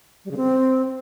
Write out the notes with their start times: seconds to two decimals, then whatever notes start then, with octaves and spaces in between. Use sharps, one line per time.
0.25 G3
0.31 C#3
0.37 C4